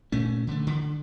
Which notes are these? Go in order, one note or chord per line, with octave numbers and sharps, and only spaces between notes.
A#2 A3 C#4
D3 E3 G#3 A3
D3